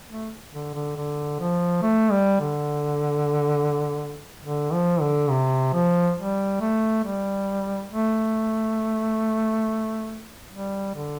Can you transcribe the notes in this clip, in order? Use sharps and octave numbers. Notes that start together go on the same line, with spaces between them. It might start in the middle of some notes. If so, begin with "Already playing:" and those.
A3
D3
D3
D3
F3
A3
G3
D3
D3
F3
D3
C3
F3
G3
A3
G3
A3
G3
D3